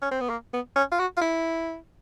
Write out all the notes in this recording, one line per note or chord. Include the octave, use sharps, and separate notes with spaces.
C#4
C4
B3
A#3
B3
C#4
F4
F#4
F4
E4